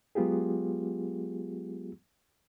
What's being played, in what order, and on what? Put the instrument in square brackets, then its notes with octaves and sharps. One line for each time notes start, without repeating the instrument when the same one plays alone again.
[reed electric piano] F#3 G#3 B3 F4 G4 G#4